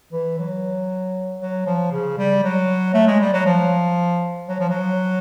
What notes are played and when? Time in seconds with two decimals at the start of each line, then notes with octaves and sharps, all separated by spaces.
0.12 E3
0.38 F#3
1.41 F#3
1.67 F3
1.92 C#3
2.18 G3
2.43 F#3
2.94 A3
3.07 G#3
3.20 G3
3.33 F#3
3.46 F3
4.48 F#3
4.59 F3
4.69 F#3